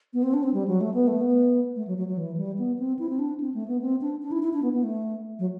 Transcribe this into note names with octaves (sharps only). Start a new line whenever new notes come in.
B3
C4
D4
C4
G3
F#3
A3
B3
A3
B3
A3
F#3
F#3
F#3
E3
G3
B3
C4
E4
C4
D4
C4
A3
B3
C4
D4
D4
E4
E4
D4
B3
B3
A3
F#3